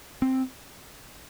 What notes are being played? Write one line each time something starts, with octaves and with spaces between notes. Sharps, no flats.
C4